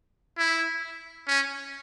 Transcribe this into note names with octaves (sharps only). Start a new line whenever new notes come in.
E4
C#4